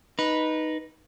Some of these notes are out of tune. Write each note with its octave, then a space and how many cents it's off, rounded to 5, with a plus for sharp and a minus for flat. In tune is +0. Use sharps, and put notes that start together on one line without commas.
D#4 +0 B4 -10